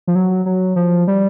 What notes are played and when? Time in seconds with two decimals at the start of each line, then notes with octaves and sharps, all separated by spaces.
0.07 F3
0.15 F#3
0.46 F#3
0.76 F3
1.08 G3